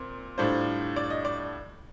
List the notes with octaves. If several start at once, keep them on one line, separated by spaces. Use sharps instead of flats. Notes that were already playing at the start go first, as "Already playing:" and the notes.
Already playing: A#2 C4
A2 G3 D4 F4 C5
D5
D#5
D5